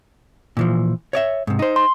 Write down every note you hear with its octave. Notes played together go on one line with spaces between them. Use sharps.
A#2 E3 F3
C#5 D5 E5
G#2 C3
D#4 C5
C6